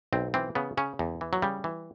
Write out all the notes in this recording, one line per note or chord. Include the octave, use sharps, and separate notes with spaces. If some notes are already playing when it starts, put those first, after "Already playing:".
B1 C4
E3 C4
C#3 B3
C#3 C#4
E2
E3
F#3
C#3 G3
E3